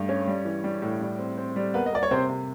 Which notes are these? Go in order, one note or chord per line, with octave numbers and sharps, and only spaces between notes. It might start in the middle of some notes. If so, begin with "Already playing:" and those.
Already playing: G2 A3
C#4
G3
E3
G3
A2
G3
C4
C4
G3
A#3 B3 B4
D#5
A#3 D5
C#5
C3 C4 C5
C3